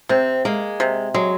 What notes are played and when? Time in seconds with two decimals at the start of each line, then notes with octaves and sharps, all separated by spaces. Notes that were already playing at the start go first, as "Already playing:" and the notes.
0.09 C3 C4
0.45 G#3 A#3
0.80 C3
1.14 F#3 G#3